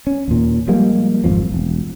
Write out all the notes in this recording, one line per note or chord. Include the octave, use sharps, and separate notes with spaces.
C#4
D#2 A#2
F3 G3 G#3 A#3
G#1 F2 F3
E1